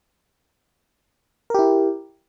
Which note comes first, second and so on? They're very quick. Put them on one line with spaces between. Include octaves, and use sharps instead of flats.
A#4 G4 E4